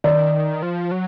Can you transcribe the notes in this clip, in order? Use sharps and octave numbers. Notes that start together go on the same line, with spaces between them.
D#3 D5
F3
F#3